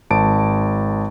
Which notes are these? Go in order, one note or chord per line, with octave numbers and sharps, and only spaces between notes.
G#1 A5 D7